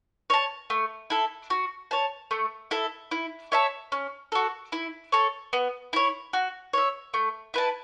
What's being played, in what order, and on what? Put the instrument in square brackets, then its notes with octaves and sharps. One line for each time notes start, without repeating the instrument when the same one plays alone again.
[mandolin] C#5 A5
A3
E4 A4
F#4
C#5 A5
A3
E4 A4
E4
C#5 E5 A5
C#4
F#4 A4
E4
A4 C#5
B3
E4 C#5
F#4
C#5 E5
A3
E4 B4 A5